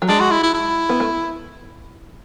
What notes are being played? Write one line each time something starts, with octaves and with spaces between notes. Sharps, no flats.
F#3
G#3 D4
F#4
E4
E4
E4
B3
A3